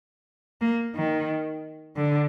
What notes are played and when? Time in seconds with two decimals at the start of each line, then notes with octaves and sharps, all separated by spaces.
0.61 A#3
0.96 D#3
1.96 D3